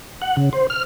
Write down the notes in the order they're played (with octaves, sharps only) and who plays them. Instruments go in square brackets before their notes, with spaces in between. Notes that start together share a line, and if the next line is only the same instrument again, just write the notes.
[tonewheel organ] F#5
C#3
C5
F6